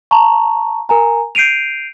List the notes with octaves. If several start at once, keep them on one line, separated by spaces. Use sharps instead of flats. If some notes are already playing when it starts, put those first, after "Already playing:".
A5 A#5 C#6
A#4 G#5 A#5
G6 C7 D7 D#7 F7